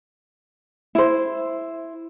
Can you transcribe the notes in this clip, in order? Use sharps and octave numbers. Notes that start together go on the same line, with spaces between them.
E4 C5